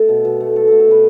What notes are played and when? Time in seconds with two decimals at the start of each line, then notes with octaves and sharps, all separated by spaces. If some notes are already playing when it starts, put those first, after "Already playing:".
Already playing: A3 A4
0.09 B2
0.25 B2
0.40 A3
0.56 A3 A4
0.67 A3 A4
0.80 A4
0.87 B2 B4